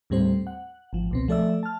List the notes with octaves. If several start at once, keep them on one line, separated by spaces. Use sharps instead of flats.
D#2 A2 G3 C4 C5
F#5
G#1 F3
C#2 B2 C4
F3 A3 A4 D5 E5 E6
A5 F6